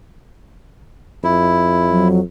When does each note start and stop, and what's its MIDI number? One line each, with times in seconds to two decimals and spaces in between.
1.24 2.21 41
1.24 2.08 64
1.89 2.20 54